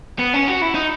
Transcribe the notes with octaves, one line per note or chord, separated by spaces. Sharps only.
B3
C#4
F#4
E4
D#4